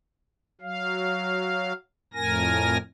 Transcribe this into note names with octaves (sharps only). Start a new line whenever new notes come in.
F#3 F5
F2 A2 A#4 G#5 A#6